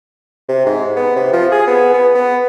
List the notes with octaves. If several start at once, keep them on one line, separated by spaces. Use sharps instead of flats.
C3
G#2
B3
C3
F3
G#4
B3
B3
B3